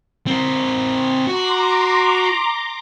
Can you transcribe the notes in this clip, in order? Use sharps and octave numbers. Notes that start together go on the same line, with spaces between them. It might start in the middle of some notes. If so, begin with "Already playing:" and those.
C4 A#4
F#4 A#5 C6 D6